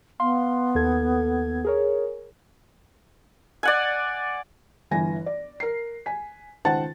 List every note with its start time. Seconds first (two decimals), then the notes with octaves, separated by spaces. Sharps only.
0.20 B3 F5 C6
0.75 D#2 A4 G#6
1.65 G#4 A#4 C#5
3.63 D5 F#5 G#5
4.91 G1 E3 G#5 A#6
5.26 D5
5.60 A#4 C7
6.06 G#5 B6
6.65 C#2 D#3 C5 F#5 A5 A6